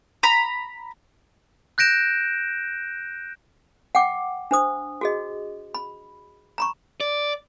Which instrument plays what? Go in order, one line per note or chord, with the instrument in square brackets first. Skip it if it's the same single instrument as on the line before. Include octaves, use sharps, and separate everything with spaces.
[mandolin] A#5 B5
[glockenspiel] F#6 G6 A#6 D7 E7
[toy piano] F#5 G5 D6
D4 C5 D#6
F#4 G#4 D#5
B5
A#5 B5 C#6
[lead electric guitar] D5